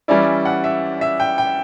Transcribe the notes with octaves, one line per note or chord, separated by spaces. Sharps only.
E3 G3 C#4 E4 D5
F#5
E5
E5
G5
G5